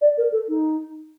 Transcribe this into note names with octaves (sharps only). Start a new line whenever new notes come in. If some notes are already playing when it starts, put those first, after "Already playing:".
D5
A#4
A4
D#4